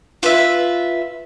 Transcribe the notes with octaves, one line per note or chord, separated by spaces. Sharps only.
F4 B4 E5